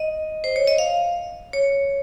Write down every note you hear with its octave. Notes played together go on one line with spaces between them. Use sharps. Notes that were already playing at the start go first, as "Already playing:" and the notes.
Already playing: D#5
C5
C#5
D#5
F5
C#5